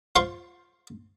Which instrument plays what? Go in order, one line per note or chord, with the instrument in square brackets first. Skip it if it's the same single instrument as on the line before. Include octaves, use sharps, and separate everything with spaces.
[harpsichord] F4 C5 C6 C#6